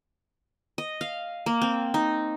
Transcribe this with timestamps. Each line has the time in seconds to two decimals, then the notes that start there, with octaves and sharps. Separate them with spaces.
0.78 D#5
1.01 F5
1.46 A#3
1.62 C4
1.94 D#4